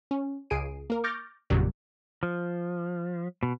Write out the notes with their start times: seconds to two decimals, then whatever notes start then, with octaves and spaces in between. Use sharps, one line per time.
0.11 C#4
0.50 C#2 G#4 C7 D7 D#7
0.90 A#3 A#4
1.04 C#6 D6 F6 G6 A6 A#6
1.50 G#1 F2 A#2 C#3 F#3 G3
2.23 F3
3.43 B2